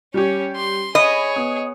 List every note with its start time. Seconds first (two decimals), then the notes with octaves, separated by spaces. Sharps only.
0.14 G3 C#4 G4 C#5
0.56 C6
0.95 G#4 C#5 D#5 B5
1.36 B3 D#6